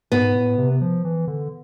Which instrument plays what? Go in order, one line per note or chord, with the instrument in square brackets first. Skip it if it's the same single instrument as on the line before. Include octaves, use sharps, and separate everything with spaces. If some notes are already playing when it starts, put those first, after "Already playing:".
[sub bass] G#2 [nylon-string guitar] B3
[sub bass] A2
C3
F3
E3
D3